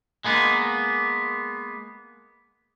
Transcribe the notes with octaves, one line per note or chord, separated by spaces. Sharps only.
G#3 A#3 B3